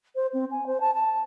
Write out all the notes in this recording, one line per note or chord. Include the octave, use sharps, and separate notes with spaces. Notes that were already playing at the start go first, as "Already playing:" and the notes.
C5
C4
G#5
C5
A5
A5